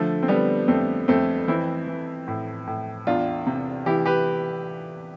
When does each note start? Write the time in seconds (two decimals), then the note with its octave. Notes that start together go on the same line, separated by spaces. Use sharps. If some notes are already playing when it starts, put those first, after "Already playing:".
Already playing: D3 F3 A3
0.23 C4
0.28 D3 G3 B3
0.68 F2 A3 C4
1.08 F2 A3 C4
1.47 E3 C4 E4
1.87 E3
2.28 A2
2.67 A2
3.07 E2 D4 F4
3.46 C3
3.86 E3 E4 G4
4.06 G4 B4